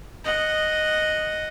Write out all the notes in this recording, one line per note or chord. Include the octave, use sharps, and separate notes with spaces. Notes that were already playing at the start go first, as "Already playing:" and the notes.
D#5 F#5